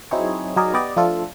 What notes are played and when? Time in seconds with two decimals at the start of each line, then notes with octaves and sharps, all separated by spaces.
0.11 F#3 C4 D#4 E4 G#4 C#5
0.56 F#3 D#4 G#4 A#4 D5 D#5
0.74 B3 G4 D5 D#5
0.96 F3 A3 D4 F4 A4